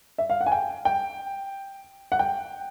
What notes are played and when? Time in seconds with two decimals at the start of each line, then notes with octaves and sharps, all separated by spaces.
0.18 E5
0.30 F5
0.41 F#5
0.46 G#5
0.52 G5
0.85 G5
2.12 F#5
2.19 G5